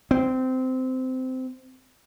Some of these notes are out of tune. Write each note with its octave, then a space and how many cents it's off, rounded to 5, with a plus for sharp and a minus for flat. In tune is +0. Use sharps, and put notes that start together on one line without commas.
C4 -20